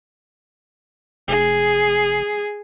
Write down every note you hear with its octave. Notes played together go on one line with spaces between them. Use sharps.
F1 G#4